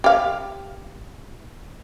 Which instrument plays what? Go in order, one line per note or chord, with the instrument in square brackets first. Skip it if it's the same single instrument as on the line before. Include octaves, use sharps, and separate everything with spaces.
[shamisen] G4 F5